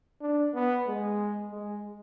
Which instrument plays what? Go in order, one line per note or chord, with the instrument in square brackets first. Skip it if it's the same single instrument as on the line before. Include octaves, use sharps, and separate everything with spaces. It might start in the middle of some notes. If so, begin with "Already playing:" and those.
[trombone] D4
B3
G#3
G#3